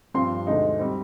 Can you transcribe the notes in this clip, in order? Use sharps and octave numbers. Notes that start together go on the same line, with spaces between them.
G2 F3 C4 C6
D2 D3 G#3 D#4
G3 C4